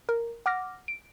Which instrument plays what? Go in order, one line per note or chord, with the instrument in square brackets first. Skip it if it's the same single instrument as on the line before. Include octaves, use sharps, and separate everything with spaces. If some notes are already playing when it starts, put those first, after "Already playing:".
[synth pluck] A#4
F#5 D6 F6 A#6
D7